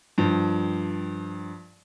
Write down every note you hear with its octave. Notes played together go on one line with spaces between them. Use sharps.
G2 F3